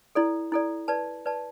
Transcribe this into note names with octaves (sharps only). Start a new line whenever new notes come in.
E4 A4 D5
E4 A4 D5
B4 D5 A5
B4 D5 A5